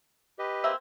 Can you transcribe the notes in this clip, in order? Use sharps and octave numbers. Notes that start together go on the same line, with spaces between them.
G4 B4 D#5
A#3 C4 E5